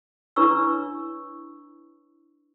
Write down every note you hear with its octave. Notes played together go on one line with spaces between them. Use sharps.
D4 E4 B4 C#5 C#6 E6